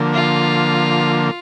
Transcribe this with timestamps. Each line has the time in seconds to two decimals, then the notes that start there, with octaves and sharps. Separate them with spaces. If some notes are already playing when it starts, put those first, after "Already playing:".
Already playing: D3 F3 A#3
0.14 F4